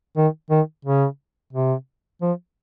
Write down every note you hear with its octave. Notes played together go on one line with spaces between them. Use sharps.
D#3
D#3
C#3
C3
F3